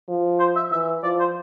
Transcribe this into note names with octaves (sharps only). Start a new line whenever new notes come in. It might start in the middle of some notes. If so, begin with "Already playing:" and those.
F3
C5
E5
E3 E5
F3 D5
C5